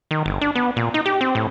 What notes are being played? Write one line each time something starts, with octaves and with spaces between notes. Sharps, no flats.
D#3
G1
D4
B3
A#2
D#4
G4
C4
A2